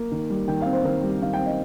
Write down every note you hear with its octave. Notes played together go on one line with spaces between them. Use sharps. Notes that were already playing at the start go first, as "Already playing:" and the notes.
Already playing: A#3
D#3
G3
D#3 G5
F5
C4
C5
D#3 A#4
G3
D#3 F5
G5
C4
D#5